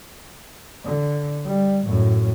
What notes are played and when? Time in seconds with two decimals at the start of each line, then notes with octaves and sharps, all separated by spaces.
0.85 D3
1.46 G3
1.86 F#2 A2